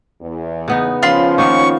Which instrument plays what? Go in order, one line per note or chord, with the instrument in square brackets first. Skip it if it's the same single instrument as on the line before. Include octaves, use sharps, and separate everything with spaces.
[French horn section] E2
[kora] C#3 B3 D#4
[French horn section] F3 C#4 [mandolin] F4 B5 C6
[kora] D#3 A#3 B3 [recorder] C#6